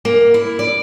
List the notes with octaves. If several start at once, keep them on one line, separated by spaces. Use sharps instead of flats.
A#3
E4
D5